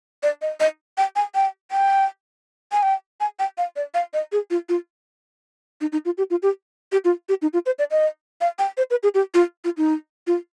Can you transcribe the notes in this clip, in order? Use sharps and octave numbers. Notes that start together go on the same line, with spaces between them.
D5
D#5
D#5
G5
G#5
G5
G5
G#5
G5
G#5
G5
F5
D5
F5
D#5
G#4
F4
F4
D#4
D#4
F4
G4
F4
G4
G4
F4
G4
D#4
F4
C5
D5
D#5
F5
G5
C5
B4
G#4
G4
F4
F4
D#4
F4